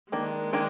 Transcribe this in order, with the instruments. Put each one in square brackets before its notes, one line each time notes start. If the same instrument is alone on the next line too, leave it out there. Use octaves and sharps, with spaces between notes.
[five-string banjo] D#3 A#3 D4 [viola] G#3
[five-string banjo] D#3 A#3 D4 G#4